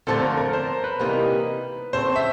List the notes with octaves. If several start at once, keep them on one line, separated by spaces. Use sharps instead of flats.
F2 D3 F3 A3 A4
A#4
A#4
C5
B4
C3 E3 G3 A#3 D#4
C#3 F3 A3 C4 C5
E5